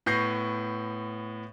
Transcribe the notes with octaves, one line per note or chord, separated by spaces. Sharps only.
A2 B3 C#6 G6 A#6 C7